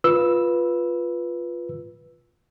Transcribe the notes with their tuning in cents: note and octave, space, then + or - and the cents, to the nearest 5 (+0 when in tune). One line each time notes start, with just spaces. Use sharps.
F4 +0 B4 -10 E6 +0